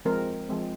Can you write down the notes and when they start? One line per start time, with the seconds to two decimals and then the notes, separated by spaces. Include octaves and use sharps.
0.05 F3 G#3 C4 A#4
0.49 F3 G#3 C4